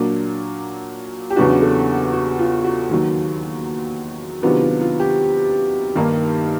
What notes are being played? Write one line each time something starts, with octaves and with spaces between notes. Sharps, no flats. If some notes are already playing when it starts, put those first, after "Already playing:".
Already playing: A#2 F#3 A#3 D4
G4
E2 C#3 F#3 B3 D4 F#4
A4
F#4
F4
F#4
D#2 D#3 F#3
C3 D#3 F#3 B3 D4 F4
F4
F4
G4
G2 D#3 G3 A#3 D#4